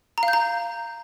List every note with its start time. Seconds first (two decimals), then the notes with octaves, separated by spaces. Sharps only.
0.18 A#5
0.23 F5
0.28 G6
0.33 A#5